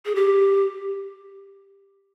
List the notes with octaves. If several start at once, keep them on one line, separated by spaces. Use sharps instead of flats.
G#4
G4